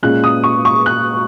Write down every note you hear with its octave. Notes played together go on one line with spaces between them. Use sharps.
A#2 G#3 C#4 F#6
D#6
C#6
C#6
F#6